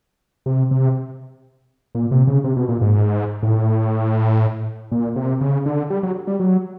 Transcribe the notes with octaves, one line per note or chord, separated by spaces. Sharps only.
C3
C3
A#2
C3
C#3
C3
B2
A#2
G#2
A2
A#2
C3
C#3
D3
G3
F#3
G3
F#3